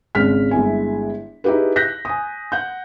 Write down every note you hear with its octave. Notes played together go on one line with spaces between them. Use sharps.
G#1 C#3 G#3 F6 B6
G1 G#3 E4 G#5
D#4 E4 G4 G#4 B4
F#6 G6 A#6 B6
G#5 D#6
F#5 G6